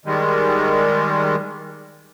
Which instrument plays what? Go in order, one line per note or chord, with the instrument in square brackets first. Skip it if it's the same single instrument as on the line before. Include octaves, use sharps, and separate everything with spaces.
[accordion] D#3 G3 G#3